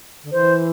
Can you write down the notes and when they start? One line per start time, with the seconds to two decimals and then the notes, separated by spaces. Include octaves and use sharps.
0.23 D3
0.32 E3 C5